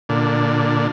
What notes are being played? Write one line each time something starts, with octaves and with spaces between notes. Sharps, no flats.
A#2 D3